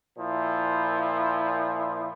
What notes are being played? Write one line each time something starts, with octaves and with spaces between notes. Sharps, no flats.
A#2 F3 E4